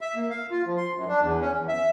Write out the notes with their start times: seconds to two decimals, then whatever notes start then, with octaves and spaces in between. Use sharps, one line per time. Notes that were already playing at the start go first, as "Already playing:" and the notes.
0.01 E5
0.15 A#3
0.30 F5
0.51 F4
0.66 F3
0.77 C6
0.96 F#2
1.08 D4
1.21 E2
1.41 C#4
1.54 E2
1.68 E5